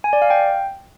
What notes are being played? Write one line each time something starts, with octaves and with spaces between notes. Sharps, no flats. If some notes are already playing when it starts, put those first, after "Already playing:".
G#5
D5
F5
G5